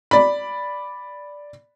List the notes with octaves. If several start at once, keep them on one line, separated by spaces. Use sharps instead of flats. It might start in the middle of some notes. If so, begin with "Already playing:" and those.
D5 B5